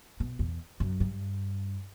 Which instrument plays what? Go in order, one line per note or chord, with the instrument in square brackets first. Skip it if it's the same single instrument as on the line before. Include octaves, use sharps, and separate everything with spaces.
[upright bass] B2
E2
F#2
G2